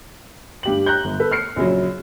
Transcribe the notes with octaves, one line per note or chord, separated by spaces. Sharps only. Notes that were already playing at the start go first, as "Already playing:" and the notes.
G2 G4 F#7
A#5 F#6 G6
G1
A4 B4
F6 C7 C#7
A#1 C#3 F#3